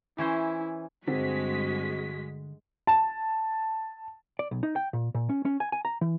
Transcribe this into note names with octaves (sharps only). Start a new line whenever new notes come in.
E3 C#4 E4 C5
G2 D3 G#3 C4 F#4 B6
A5
D5
B1
D#4
G5
A#2
A#2
C#4
C#4
G#5
G#5
A#5
E3